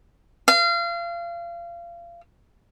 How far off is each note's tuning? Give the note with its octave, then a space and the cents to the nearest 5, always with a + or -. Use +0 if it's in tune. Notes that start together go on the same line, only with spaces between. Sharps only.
F5 -30